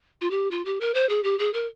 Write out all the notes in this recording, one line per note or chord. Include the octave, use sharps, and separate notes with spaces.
F4
G4
F4
G4
A#4
C5
G#4
G4
G#4
A#4